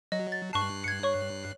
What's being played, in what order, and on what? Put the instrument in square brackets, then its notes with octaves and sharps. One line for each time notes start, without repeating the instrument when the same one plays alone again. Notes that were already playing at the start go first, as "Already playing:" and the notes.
[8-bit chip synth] F#3 [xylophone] D#5
[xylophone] A6
[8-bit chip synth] G2 F#6 C7 [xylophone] A5 C#6
[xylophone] G#6 C#7
C#5 C#6